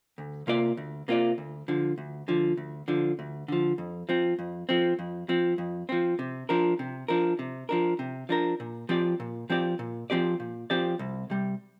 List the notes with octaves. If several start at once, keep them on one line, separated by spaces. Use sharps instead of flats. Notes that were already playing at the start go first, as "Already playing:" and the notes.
D2
C3 A#3 F4 D5
D2
C3 A#3 F4 D5
D2
D3 F3
D2
D3 F3
D2
D3 F3
D2
D3 F3
F2
F3 C4
F2
F3 C4
F2
F3 C4
F2
F3 C4
C3
F3 D4 A#4
C3
F3 D4 A#4
C3
F3 D4 A#4
C3
F3 D4 A#4
A#2
F3 C4 G4 D5
A#2
F3 C4 G4 D5
A#2
F3 C4 G4 D5
A#2
F3 C4 G4 D5
C2
C3 G3